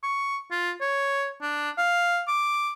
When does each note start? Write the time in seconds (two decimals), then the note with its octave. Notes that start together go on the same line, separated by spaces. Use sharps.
0.03 C#6
0.51 F4
0.81 C#5
1.41 D4
1.78 F5
2.27 D6